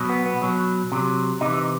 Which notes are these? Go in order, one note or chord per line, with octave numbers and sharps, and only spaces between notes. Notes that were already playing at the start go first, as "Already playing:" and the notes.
Already playing: B2 F#3
B3
B3
B2 F#3
C3 F#3
C3 E3 D#4